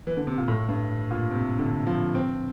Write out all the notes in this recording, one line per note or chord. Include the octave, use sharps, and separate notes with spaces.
E3
D3
C3
A#2
A2
G2
A#2
C3
D3
F3
C4